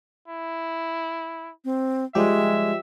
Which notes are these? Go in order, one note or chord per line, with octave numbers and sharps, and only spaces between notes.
E4
C4
F3 G3 G#3 G4 E5